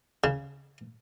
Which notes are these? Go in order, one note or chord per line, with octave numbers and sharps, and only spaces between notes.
C#3